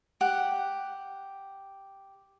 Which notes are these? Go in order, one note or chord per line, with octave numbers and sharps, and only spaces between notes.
G4 F#5